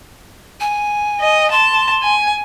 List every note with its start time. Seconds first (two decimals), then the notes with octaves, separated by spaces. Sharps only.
0.60 G#5
1.21 D#5
1.52 A5 C6
2.03 G#5